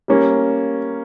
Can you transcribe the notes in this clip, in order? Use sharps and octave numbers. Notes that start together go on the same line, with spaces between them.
G3 A#3 C#4